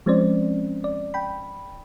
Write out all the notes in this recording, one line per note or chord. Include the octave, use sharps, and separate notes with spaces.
F3 G#3 C4 C#4 C5 D5
D5
G5 B5